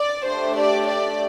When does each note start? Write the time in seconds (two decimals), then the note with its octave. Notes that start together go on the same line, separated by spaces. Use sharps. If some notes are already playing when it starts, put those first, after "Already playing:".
Already playing: D5
0.25 A3 D4 G4 C5
0.56 D5
0.86 D5